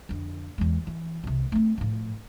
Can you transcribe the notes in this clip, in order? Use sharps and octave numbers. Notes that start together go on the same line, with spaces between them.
F2 D3
E2 G#3
E3
C2 C3
A3 C4
A2 F3